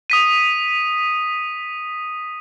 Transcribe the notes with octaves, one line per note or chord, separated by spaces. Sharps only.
D#6 B6 D#7